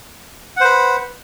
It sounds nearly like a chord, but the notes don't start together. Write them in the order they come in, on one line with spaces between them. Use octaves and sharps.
F#5 C5 B4